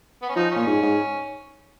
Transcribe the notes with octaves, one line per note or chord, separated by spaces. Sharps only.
B3
C#4
F3 D#4
A#2 C#4
G#2
G#2